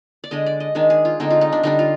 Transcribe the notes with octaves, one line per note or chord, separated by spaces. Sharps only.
D5
D3 G#3 D4 D#5
D5
D#5
D#3 G#3 D4
G#4
F4
D3 G#3 C4 D#4
F4
D#4
D4
D3 G3 D4 D#4
F4